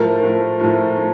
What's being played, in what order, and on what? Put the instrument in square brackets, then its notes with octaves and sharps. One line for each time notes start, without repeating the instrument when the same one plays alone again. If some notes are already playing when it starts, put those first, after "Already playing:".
Already playing: [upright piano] A2 F3 A3 [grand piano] A#4
[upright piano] A2 F3 A3
A2 F3 A3
F3 A3